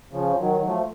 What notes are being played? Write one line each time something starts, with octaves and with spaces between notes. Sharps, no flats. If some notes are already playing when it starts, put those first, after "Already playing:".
C#3 F3
D#3 F#3
F#3
F3 A3